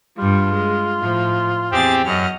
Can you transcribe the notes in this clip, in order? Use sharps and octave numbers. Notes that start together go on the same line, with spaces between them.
G2 G3 F4
G#3
A2 F3
E2 C4 G4 G#4 A6
F#2 D#5 F#5 F6